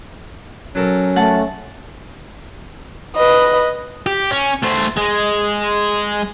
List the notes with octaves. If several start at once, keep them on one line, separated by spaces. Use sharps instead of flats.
F#3 C#4 A4 A#4
A3 F#5 A5
B4 D#5
G4
C#4
A3 C5
G#3